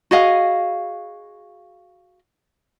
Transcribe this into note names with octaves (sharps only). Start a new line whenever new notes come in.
F#4 G#4 D#5 F5